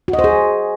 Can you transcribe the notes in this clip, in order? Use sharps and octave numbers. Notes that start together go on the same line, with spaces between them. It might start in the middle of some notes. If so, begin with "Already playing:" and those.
F#4
D#5
C5
G#4